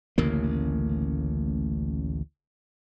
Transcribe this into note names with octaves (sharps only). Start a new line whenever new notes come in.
A1 D2 C#3 A#3